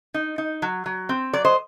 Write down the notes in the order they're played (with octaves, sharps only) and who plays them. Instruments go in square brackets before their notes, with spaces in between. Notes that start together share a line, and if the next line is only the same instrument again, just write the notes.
[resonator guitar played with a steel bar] D#4
D#4
F#3
F#3
C4
F#3 D5
C5 D#5